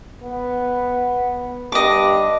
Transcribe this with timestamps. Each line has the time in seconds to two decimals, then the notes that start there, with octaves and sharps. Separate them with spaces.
0.23 B3
1.72 G2 D#5 D6